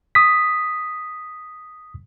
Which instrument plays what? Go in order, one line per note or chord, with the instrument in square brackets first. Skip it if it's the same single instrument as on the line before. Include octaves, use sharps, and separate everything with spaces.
[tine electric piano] D#6 B6